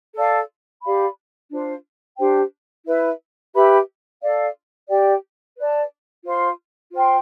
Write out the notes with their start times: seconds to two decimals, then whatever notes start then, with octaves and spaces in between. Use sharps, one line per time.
0.14 A4 D5 F5
0.82 G4 D5 F5 B5
1.50 D4 F4 C5
2.17 D4 G4 C5 G5
2.85 E4 B4 E5
3.54 G4 B4 E5 B5
4.21 A4 D5 F5
4.89 G4 D5 G5
5.57 B4 D5 A5
6.24 F4 C5 F5 C6
6.92 F4 C5 G5 C6